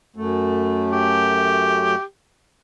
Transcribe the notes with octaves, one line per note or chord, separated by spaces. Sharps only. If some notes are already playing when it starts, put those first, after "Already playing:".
F#2 A3
G4